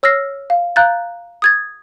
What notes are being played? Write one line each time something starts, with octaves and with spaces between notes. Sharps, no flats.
C#5 E6 F6 A#6 C7
F5
F5 A#5 F#6 G6 A6
D#6 G#6 A6